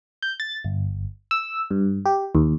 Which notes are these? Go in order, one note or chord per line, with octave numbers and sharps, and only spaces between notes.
G6
A6
G1
E6
G2
G4
D#2